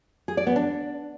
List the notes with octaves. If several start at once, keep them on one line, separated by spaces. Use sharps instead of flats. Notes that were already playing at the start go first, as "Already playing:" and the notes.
G#4
D5
B3
D4